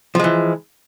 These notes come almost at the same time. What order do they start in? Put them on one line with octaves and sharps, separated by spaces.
F3 G#3 E3